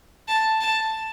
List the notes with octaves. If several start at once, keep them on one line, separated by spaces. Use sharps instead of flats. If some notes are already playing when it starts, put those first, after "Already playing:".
A5
A5